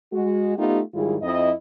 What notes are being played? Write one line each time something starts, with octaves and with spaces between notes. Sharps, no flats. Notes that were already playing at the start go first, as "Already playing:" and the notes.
G#3 F#4
A3 B3 D#4 F4 G4
G#2 D#3 G3 E4 F4 G#4
F2 E4 D#5